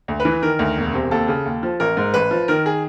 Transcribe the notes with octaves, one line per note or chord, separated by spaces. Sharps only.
D2
B4
E3
D#3 A#4
D2
E1
C3
D#2 A4
C#3
D#2
F3
A1 A#4
G#2
A1 B4
F3
D#3 A#4
G#4